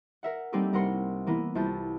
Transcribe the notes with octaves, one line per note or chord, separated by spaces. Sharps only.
A#4 E5 F#5
G3 A#3 C4 D#4 G4 A4
C2 A#4 F#5 C6 C#7
E3 A#3 B3 E4
C2 F4 E5 A5 G6